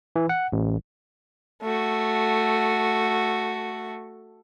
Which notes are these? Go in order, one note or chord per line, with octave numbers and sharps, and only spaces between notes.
E3
F#5
A1
A3 F#4